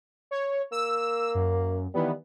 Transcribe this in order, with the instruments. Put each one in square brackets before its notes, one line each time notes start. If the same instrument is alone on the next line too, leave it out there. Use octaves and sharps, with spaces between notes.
[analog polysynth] C#5
[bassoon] A#3 [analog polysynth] E6
[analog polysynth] F#2
[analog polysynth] D#3 E3 B3 [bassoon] G3